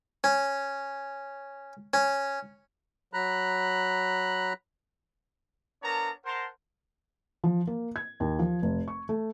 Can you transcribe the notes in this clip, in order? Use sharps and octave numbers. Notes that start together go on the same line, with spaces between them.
C#4
C#4
F#3 A#5 B5 F#6
B3 D4 A#4 C#5 A5 A#5
A#4 C5 F#5 A5 A#5 C6
F3
A#3
G#6
D#2
F3
F1
C#6
A3